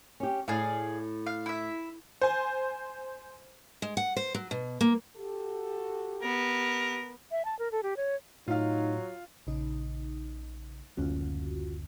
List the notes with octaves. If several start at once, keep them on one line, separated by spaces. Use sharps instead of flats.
C#4 G4
A2 G#4 D5 F5
F5
E4 E5
C5 G#5
G#3
F#5
C5
F#3
B2
A#3
F#4 G4 A4
B3 A#4
E5
A5
A#4
A4
G4
C#5
A2 F#3 D#4 F4 F5
A#1 C#3 D#4
F#1 D2 C#4 F4 F#4